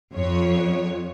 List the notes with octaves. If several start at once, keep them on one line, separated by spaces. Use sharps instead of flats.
F2 C#5